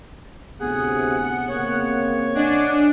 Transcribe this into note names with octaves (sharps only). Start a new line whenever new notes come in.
D2 A2 C3 B3 G#4 F#5
C#3 A#3 C4 C#5
D4 D#5 F#5 G#5